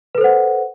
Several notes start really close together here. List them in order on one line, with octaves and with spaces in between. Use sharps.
B4 A4 C5 F#5